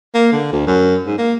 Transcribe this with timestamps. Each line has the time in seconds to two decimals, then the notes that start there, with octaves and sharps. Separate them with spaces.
0.15 A#3
0.33 D3
0.53 D2
0.67 F#2
1.07 G#2
1.18 A#3